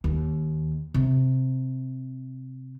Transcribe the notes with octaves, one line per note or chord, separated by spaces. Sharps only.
D#2
C3